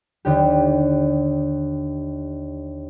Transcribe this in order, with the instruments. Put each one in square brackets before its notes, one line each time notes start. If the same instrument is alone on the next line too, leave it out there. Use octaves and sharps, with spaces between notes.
[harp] D#2 D3 G4